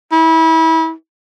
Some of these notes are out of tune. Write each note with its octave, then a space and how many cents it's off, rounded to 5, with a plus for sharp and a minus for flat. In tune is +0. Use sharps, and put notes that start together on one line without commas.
E4 -30